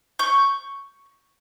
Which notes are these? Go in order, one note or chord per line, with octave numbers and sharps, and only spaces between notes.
C#6 G6